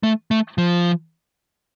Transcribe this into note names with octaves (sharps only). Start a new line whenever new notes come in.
A3
A3
F3